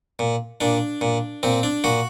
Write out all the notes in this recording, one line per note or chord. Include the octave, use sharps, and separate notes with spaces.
A#2
A#2 D4
A#2
A#2 C4
D4
A#2 F#4